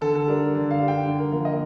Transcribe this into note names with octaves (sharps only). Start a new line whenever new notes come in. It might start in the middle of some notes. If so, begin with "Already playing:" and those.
D3 A4
A4
G3 D4 A#4
D3
F5
G3 D4
G5
D3
A#4
F3 A#3 A#4
D#5